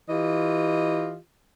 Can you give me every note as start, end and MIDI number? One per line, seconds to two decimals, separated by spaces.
0.10 1.16 52
0.10 1.16 65
0.10 1.16 67
0.10 1.16 75